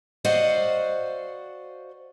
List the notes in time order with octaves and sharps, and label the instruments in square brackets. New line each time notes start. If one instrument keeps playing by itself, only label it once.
[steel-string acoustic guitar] F#4 C5 D5 D#5 F5 F#5